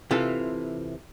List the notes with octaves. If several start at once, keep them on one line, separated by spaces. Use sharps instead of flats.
C3 E3 F4 A4